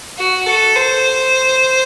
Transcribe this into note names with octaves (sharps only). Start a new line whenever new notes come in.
F#4
A4
C5